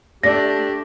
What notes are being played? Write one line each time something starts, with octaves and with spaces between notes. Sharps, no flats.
A3 D4 G4 D5 A#6